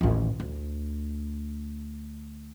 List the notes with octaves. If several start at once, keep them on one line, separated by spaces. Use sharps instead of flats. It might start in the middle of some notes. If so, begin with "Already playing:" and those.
A1 D#2
D2